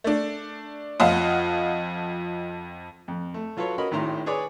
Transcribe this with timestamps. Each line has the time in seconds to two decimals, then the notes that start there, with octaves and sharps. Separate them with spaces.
0.04 A3 D4
1.00 F2 F3 D#5 F5 F#5 E7
3.08 F2
3.34 A3
3.57 F#3 F4 A4 B4 C#5
3.78 C#4 F#4 A#4 D#5 B5
3.91 G#1 A2 D#3 E4 A#5 C6
4.26 G#4 B4 C#5 D5 G#5 D6